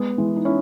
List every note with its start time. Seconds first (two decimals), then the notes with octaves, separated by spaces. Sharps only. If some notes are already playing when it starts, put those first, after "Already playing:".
Already playing: G#3 B3
0.18 E3 G#3
0.36 D#4
0.45 C#4 E4